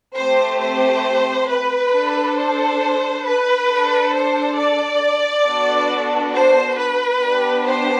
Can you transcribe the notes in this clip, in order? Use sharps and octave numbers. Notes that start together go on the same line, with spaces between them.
A3 C4 G4 C5
C5
B4
D4 A4
C5
B4
D4 A4
C5
D5
B3 D4 F#4 A4
C5
B4
B3 D4 G4
C5